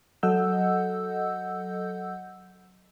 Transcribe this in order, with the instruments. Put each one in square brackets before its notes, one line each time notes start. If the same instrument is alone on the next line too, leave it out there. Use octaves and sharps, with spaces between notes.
[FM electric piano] F#3 A4 D#5 F#5 E6 G6